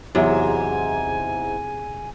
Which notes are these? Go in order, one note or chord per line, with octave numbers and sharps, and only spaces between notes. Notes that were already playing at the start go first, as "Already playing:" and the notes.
E2 G#2 C3 F#3 E5 G#5